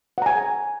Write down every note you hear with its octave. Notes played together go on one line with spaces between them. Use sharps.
F#5 G#5 A#5